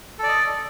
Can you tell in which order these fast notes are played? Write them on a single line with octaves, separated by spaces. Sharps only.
A4 D5 D#5